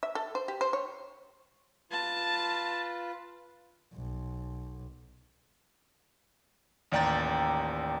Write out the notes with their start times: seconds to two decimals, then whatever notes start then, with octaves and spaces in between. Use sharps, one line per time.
0.03 E5
0.15 A4
0.35 C5
0.48 G4
0.61 C5
0.73 C#5
1.91 F4 B4 A5
3.94 B1
6.92 A1 D#2 D5 G5 A#5 A6